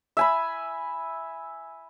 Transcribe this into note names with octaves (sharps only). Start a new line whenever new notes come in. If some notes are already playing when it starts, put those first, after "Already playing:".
E5 G#5 B5